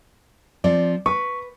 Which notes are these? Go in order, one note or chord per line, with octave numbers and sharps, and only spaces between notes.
F3 C4 D5
B4 C#6